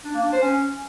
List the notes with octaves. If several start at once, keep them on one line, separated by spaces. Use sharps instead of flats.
D4
A#3
D4
C5
C#4